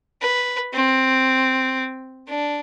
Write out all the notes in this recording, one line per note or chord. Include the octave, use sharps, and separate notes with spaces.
B4
C4
D4